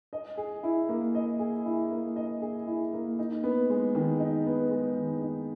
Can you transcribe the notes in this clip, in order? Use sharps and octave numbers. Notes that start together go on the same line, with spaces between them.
D#5
G#4
E4
A#3
D#5
G#4
E4
A#3
D#5
G#4
E4
A#3
D#4
B3
G#3
D#3
D#4
B3
G#3
D#3
D#4